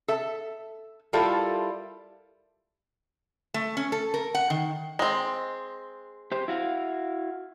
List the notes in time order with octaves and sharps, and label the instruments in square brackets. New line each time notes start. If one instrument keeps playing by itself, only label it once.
[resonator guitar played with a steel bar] A4 E5
G3 E4 F4 A4 A#4 E5
A3
C#4
A4
A#4
F#5
D#3
[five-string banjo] G#3 C4
[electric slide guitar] G4 C5
E4 F#4 F5